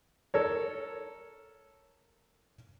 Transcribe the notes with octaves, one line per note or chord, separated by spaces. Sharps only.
A4 A#4 C#5